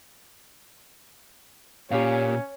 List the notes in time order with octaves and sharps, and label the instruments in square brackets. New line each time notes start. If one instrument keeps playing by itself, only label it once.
[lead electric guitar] A#2 [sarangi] C#4 [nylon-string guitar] G4 C#5 F5